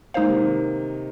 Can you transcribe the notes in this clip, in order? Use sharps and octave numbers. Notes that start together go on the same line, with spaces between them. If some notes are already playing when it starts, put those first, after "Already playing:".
G#3 A#3 D#4 C5 F5
C3
D#3